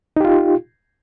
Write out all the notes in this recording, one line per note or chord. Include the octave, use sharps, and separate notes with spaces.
D#4 F4 G4